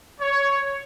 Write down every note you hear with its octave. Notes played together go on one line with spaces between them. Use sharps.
C#5